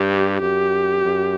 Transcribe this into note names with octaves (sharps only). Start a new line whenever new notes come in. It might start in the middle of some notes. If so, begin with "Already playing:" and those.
Already playing: G2 G4
F#2 G4
F#2